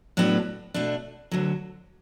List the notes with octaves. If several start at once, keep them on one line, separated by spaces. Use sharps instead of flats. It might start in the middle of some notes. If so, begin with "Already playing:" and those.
A2 F#3 B3 D4
B2 A3 D4
D2 D3 F#3